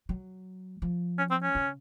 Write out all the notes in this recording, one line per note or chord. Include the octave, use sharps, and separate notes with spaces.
F#3
F3
C#4
C4
C#4
C#3